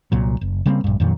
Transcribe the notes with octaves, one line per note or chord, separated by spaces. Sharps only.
C2 A#2 F#3
F#1
C#3 G3 A#3 C4
A#1 G2
F2 A#2 D#3 F#3